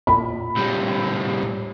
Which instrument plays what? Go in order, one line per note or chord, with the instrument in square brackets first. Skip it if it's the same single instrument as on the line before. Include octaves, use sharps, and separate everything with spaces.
[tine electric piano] A#2 [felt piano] B5
[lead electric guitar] A2 G3